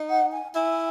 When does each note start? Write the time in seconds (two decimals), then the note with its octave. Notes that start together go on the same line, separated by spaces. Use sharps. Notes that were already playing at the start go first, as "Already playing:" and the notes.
Already playing: D#4
0.10 F#5
0.32 G#5
0.55 E4 G#5